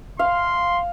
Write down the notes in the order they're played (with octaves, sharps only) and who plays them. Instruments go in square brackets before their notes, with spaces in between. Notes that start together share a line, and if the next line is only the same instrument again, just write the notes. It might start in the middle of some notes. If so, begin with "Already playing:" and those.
[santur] F5 [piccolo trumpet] C6